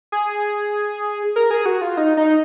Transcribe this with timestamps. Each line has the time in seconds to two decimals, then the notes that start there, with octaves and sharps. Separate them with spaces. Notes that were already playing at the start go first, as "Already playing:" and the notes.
0.12 G#4
1.36 A#4
1.51 G#4
1.66 F#4
1.81 F4
1.97 D#4
2.17 D#4